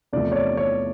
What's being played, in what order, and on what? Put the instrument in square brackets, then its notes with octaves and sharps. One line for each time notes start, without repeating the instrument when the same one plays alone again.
[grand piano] E2 C3 F3 A3 D5
C#5
D5
C#5